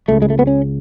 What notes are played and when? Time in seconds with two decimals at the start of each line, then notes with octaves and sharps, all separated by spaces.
0.08 C#2 C#3 A3
0.22 G#3
0.30 A3
0.39 B3
0.47 C#4